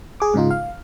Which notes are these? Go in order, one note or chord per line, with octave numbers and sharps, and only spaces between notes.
G#4 D6
G#2 C#3 D#4 F4
F5